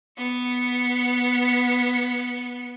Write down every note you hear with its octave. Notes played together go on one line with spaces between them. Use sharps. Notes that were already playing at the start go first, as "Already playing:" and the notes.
B3 C#7